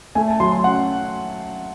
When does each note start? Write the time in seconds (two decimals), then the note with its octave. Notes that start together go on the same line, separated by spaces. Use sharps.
0.15 A3 G#5
0.28 A5
0.40 F#3 C6
0.52 C6
0.64 C#4 F#5